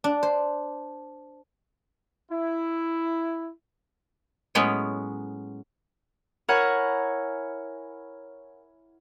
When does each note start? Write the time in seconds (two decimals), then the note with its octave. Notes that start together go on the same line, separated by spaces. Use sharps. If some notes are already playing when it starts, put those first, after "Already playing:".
0.04 D4
0.23 C5
2.31 E4
4.55 A2 F#3 G#3 B3 C#4
6.48 E4 A#4 C#5 F#5 G#5